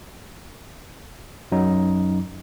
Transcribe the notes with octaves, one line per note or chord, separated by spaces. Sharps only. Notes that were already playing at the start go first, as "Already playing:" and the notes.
F#2 F#3 D#4